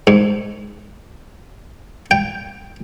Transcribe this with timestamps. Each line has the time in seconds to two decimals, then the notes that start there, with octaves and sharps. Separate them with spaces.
0.07 G#2
2.11 G5